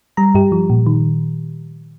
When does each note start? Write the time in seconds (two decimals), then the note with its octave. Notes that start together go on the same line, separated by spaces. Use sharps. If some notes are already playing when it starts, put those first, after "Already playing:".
0.17 G3 A#5
0.34 G2 G4
0.52 F3
0.70 A#2
0.86 D#3